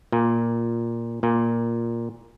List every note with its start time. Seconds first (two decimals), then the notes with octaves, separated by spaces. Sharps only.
0.12 A#2
1.23 A#2